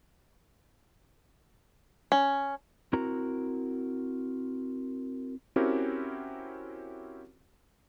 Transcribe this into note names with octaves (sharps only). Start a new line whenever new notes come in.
C#4
C4 E4 F#4 A#4 A#5
C4 C#4 E4 F#4 G4 A#4